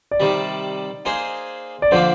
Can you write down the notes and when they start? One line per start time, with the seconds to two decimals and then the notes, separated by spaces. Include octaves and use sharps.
0.11 D5
0.20 C3 D#3 G3
1.05 A#3 D#4 G#4 C5
1.82 D5
1.91 D3 F3 A#3 D4 C5